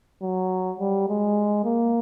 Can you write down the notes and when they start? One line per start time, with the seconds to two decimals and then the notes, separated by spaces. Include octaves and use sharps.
0.22 F#3
0.80 G3
1.08 G#3
1.64 A#3